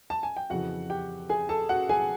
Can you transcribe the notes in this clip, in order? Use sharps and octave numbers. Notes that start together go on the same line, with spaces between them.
A5
G#5
G5
F2 C#3 E3 F#4 F#5
G4 G5
G#4 G#5
A4 A5
F#4 F#5
G#4 G#5